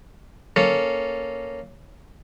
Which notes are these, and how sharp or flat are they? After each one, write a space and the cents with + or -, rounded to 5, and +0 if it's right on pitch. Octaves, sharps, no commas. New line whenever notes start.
A#3 +0 C#4 +0 A4 +0